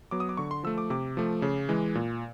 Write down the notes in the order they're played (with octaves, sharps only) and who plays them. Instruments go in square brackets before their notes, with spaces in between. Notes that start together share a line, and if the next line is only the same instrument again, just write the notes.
[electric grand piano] F#3 B3 D6
D#6
D6
D3 C#6
C6
F3 A3 E6
D6
C3 D6
F3 A3
C#3
E3 G#3
A#2